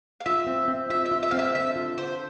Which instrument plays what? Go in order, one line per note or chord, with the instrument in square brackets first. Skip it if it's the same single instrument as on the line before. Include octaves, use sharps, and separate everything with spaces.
[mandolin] F5
[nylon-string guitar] F4 [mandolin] E5
[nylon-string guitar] C4
C4
[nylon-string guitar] F4 [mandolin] E5
[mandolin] E5
[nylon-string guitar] F4
[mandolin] E5
[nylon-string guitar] C4 [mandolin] F5
[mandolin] E5
[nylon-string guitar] D3 [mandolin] E5
[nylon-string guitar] F4
[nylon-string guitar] D3 [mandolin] C5